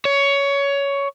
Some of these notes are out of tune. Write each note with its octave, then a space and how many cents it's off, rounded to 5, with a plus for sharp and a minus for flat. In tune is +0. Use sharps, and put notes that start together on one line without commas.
C#5 +15